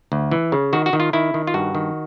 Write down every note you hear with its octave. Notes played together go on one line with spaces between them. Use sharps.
D2
E3
C#3
D#3 F#4
F#4
D#3
F4
D#3 E4
D#3
F4
G2 F#4
D#3